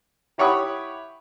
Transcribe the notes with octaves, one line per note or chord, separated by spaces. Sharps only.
E4 G4 C#5 F#5 B5 D#6